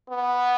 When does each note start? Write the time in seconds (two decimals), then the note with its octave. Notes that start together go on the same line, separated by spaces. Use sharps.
0.09 B3